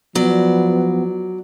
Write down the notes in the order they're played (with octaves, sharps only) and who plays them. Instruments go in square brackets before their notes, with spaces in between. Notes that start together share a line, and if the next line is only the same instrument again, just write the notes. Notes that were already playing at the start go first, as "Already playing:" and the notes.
[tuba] F3 [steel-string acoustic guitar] F#3 D5 [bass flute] B3